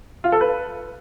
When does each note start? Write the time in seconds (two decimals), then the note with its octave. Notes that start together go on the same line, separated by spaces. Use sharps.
0.24 F4
0.32 A4
0.41 B4